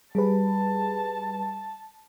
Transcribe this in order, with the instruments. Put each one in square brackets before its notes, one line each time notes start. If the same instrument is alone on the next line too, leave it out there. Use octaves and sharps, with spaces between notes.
[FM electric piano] G3 G#4 B4 [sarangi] A5